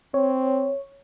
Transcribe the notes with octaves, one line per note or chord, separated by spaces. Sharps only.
C4 C#5